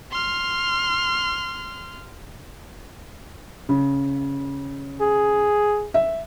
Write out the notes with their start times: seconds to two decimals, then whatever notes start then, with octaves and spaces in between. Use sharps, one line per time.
0.11 C6 F6
3.69 C#3
5.01 G#4
5.94 E5